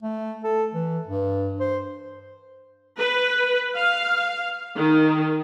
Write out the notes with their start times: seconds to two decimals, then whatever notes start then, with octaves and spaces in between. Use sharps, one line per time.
0.03 A3
0.44 A4
0.74 E3
1.07 G2
1.60 C5
2.97 B4
3.74 F5
4.77 D#3